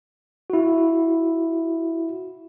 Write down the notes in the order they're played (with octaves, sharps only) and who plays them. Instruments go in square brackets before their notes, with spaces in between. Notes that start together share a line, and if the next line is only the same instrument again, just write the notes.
[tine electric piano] E4 F#4